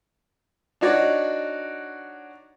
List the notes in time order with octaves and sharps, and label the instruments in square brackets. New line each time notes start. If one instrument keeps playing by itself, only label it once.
[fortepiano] D4 D#4 F#4 C#5 D5